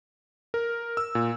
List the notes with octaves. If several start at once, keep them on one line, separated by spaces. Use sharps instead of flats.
A#4
E6
A#2